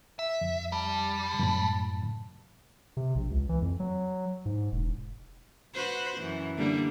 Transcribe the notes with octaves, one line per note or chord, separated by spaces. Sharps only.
E5
F2
G3 A5
F#2 A2
C3
A#1
C#2
E3
F2
F#3
G#2
E1
F#4 B4 C5
F#2 E3
D3 G3 A#3